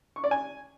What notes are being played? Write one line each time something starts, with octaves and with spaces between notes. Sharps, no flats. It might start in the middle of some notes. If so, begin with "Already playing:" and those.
C#6
D5
G#5